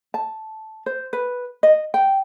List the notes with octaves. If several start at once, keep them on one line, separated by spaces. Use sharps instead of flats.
A5
C5
B4
D#5
G5